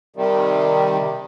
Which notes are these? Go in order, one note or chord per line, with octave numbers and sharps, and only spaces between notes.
C3 D#3 G3